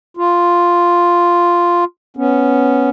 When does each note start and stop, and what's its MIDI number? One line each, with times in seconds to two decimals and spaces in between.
0.17 1.84 65
2.17 2.90 59
2.17 2.90 61